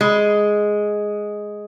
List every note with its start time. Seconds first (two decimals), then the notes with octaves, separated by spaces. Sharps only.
0.01 G#3